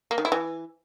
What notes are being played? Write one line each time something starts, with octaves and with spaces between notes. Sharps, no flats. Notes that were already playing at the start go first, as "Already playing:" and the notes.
A#3
D#3
E4
E3